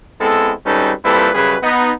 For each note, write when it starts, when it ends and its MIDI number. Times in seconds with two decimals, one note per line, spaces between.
0.20 0.52 56
0.20 0.52 59
0.20 0.52 60
0.20 0.52 64
0.20 0.52 69
0.65 0.92 32
0.65 0.92 55
0.65 0.92 61
0.65 0.92 63
0.65 0.92 69
0.65 0.92 71
1.04 1.29 46
1.04 1.29 55
1.04 1.29 60
1.04 1.29 64
1.04 1.29 69
1.04 1.29 71
1.34 1.56 42
1.34 1.56 49
1.34 1.56 55
1.34 1.56 68
1.34 1.56 71
1.63 1.92 59
1.63 1.92 63